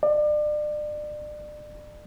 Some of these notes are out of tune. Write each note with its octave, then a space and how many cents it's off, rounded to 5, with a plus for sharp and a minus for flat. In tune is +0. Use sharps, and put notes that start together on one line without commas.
D5 +35